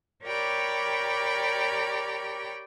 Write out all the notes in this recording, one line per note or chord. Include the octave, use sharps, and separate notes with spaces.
G4 A#4 C#5 D5 G5 B5